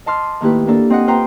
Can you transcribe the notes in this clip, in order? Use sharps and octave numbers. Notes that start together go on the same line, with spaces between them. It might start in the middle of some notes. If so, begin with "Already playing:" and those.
D#5 A5 C6 D6 F6
A2 D#3 A#3 E4 G4 B4
A#3 D4 A4
C4 D#5 F#5
F4 B4 C5 G5 A#5